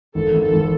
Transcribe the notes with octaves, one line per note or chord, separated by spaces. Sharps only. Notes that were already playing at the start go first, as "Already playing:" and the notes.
G#1 A4
G#1
A4
G#1